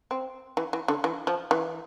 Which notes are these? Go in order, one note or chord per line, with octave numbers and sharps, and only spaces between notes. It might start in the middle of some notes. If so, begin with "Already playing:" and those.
C4
E3
E3
D3
E3
F3
E3